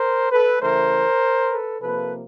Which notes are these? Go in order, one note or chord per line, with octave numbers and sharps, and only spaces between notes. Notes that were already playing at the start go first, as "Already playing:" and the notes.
Already playing: A#4 C5
A4 B4
C#3 E3 A3 A#4 C5
A4 B4
C3 F3 A#3 A4 B4